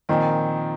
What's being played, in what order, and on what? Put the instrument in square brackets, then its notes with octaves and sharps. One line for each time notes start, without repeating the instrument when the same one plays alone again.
[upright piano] A#2 F3 C4 [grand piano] D#3